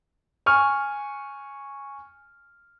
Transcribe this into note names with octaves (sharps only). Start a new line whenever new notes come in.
G#5 C#6 F6